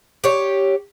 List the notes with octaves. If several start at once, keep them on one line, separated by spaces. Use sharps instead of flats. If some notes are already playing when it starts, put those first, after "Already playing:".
G4 C#5